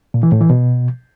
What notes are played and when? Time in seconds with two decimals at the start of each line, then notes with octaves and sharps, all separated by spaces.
0.14 A#2
0.23 E3
0.32 A2
0.41 E3
0.50 B2